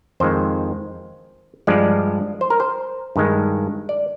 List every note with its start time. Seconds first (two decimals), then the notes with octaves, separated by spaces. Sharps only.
0.20 F2 D#3 G#3 C5
1.67 G2 F3 G#3 D5
2.41 C5
2.50 A#4
2.60 C5
3.16 G2 D#3 G#3
3.89 D5